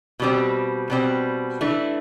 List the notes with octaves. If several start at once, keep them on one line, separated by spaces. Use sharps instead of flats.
B2 G3 C4
B2 G3 C4
E3 A3 D4